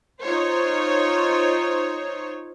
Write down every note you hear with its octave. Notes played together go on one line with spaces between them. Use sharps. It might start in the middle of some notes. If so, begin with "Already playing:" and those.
D#4 F4 C5 C#5